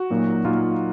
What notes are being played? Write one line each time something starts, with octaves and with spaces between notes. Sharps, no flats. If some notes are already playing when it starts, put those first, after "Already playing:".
Already playing: F#4
A#2 F#3 A#3 D#4
A#2 F#3 A#3 D#4 F4